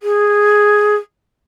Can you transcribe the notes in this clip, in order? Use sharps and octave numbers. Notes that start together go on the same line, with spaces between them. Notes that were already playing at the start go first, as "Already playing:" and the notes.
G#4